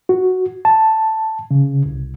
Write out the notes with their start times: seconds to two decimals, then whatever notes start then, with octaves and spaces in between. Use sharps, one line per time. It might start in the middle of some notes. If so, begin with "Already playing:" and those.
0.09 F#4
0.65 A5
1.51 C#3
1.85 C2